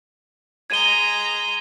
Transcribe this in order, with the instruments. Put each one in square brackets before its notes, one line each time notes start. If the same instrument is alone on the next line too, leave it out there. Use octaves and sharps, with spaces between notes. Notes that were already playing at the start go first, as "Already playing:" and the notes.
[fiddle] G#3 A#5 [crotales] G#6 D#7 G7